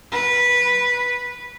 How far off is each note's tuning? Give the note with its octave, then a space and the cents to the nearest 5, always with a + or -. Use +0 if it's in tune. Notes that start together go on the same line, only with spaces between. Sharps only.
B4 -10